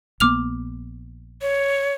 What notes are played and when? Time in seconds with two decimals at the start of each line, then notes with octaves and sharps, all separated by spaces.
0.20 A#1 A#3 B3 D6 F6 F7
1.42 C#5